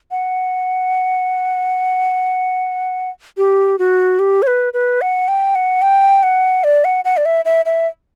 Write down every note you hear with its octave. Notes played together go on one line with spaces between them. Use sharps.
F#5
G4
F#4
G4
C#5
B4
B4
F#5
G5
F#5
G5
F#5
D5
F#5
F#5
D5
E5
E5
E5